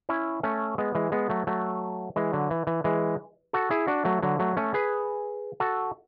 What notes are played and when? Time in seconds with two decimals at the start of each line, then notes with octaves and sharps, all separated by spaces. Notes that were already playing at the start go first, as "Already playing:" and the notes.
0.09 C#4 E4
0.43 A3 C#4
0.78 G#3 B3
0.95 E3 G#3
1.12 G#3 B3
1.30 F#3 A3
1.47 F#3 A3
2.16 E3 G#3
2.33 D3 F#3
2.50 E3
2.67 E3
2.84 E3 G#3
3.53 F#4 A4
3.70 E4 G#4
3.87 D4 F#4
4.05 F#3 A3
4.23 D3 F#3
4.39 F#3 A3
4.57 A3 C#4
4.74 G#4 B4
5.60 F#4 A4